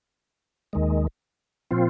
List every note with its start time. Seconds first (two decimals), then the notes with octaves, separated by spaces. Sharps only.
0.73 D#2 D#3 G#3
1.71 A#2 F3 C4 F4